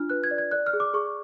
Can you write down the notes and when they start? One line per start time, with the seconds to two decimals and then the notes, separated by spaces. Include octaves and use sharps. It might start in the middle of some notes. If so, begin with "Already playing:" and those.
Already playing: D4 F4 F6
0.10 B4 F#6
0.24 G#6
0.31 D5
0.38 G#6
0.51 D5 F#6
0.66 F6
0.73 G#4
0.80 D6
0.94 G#4 C#6